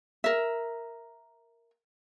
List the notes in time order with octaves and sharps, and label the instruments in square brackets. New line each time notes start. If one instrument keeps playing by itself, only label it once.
[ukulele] A#4 E5